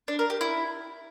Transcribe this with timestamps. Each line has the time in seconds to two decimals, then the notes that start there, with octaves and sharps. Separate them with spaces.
0.08 D4
0.19 A#4
0.30 G4
0.41 E4